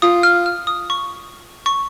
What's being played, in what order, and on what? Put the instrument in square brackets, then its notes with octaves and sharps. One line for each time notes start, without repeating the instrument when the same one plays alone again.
[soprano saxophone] F4 [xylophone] D#6
[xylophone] F6
F6
D#6
C#6
C#6